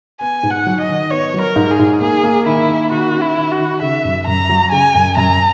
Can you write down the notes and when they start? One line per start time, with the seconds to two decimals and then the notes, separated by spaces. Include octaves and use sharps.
0.21 B3 G#5
0.43 G#2
0.51 F#5
0.67 F#3
0.81 D#5
0.89 D#3
1.10 B3 C#5
1.34 F#3
1.41 A#4
1.56 G#2
1.71 G#4
1.79 G#2
2.01 A#3 G#4
2.23 A#3
2.46 D#3 E4
2.69 A#3
2.91 D#3 F#4
3.14 C#4
3.21 E4
3.37 D#3
3.52 F#4
3.59 D#3
3.82 C#3 E5
4.05 F#2
4.27 F#2 A#5
4.49 F#3
4.72 C#3 G#5
4.95 F#2
5.17 F#2 A#5